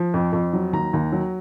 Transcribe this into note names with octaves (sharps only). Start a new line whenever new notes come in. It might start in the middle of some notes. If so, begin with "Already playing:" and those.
Already playing: F3
F2
F2
F#3
D#2 A#5
D#2
F#3